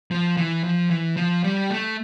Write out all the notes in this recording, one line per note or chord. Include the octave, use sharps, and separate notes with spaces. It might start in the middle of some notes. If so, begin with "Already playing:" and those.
F3
E3
F3
E3
F3
G3
A3